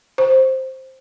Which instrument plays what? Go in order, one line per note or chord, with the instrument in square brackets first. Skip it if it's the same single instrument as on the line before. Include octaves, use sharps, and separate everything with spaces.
[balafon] C5